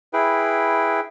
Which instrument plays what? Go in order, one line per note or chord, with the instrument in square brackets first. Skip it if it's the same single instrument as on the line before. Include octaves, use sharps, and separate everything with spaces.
[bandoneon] E4 G#4 B4 G5